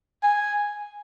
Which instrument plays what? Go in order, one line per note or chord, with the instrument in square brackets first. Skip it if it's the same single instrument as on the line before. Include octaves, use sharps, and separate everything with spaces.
[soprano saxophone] G#5